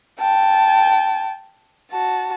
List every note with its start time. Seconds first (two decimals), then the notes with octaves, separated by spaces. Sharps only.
0.20 G5 A5
1.92 F#4 A5